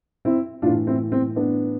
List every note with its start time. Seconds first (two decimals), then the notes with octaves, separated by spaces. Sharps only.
0.25 C4 E4
0.62 A2 D4 F4
0.67 E3
0.87 C4 E4
1.12 C4
1.36 B3 D4